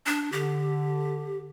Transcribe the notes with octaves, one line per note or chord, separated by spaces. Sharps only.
D4
D3 G4